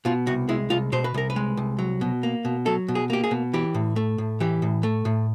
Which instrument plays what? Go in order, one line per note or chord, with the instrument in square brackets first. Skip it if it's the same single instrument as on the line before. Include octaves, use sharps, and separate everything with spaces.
[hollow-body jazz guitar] B2 F4
C2 F#4
G#3 E4
C2 F4
B2 C5
B4
C2 A#4
B4
G#3
C2
F#3
B2
A#3
B2
F#3 A4
B2
G#4
A#3 G4
G#4
B2
E3 G4
A2
A3
A2
E3 G4
A2
A3
A2